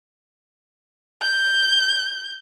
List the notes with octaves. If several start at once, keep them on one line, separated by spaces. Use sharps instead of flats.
G6